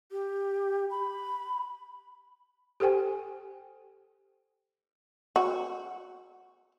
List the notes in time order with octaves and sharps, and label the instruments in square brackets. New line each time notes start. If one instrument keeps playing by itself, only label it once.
[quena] G4
B5
[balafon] G4 A4 C5 G5 G#5
[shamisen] F#4